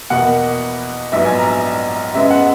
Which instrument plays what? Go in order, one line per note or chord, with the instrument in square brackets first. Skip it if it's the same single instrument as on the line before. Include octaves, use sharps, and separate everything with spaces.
[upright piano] E2 B2 A#3 F#5
A#1 G#2 F#3 B3 E5
G#5
A#5
F#2 C#3 G#3 B3 E5
F#5